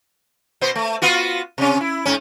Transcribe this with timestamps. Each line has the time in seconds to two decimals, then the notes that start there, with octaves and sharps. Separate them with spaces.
0.61 B2 B3 C5
0.75 A3
1.02 B3 F4 F#4
1.58 C3 C#4
1.81 E4
2.05 G#2 C#4